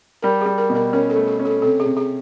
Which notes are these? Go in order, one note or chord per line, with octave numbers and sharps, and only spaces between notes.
G3 A#4
G3 G#4
A#4
B2
A#4
C#4 A#4
A4
A3
A4
C#4
A4
C3 A4
G#4
C3
G#4